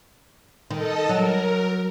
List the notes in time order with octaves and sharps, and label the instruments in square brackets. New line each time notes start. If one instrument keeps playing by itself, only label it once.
[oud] D#3 [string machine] A4 D#5 A5
[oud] F#3 [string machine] A#4